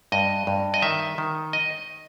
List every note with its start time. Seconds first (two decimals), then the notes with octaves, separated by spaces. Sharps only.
0.12 G2 D#5
0.47 G2
0.74 D#5
0.82 D#3 E5
1.18 D#3
1.53 D#5